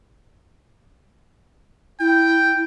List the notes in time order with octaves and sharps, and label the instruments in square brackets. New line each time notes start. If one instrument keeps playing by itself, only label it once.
[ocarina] E4 [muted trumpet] G5